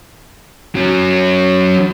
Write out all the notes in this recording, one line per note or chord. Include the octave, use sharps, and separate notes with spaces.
F#3 C#4